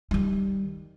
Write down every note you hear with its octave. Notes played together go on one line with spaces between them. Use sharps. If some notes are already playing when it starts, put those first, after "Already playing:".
D#3 G3